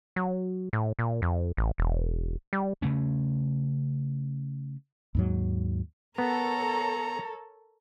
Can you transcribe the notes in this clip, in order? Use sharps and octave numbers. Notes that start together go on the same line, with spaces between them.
F#3
A2
A#2
F2
A1
E1
G3
C#3 A3 C#4
D#2 G#2 F#3
B3 A4 A#4 C#5 A#5